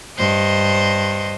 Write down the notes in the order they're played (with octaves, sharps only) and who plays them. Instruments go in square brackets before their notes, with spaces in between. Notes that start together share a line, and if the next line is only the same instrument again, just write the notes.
[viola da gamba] G2 C5 D#5